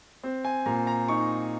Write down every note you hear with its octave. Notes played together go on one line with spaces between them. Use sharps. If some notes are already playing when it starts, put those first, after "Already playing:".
C4
G#5
A#2 A#5
A#5
D#4 C#6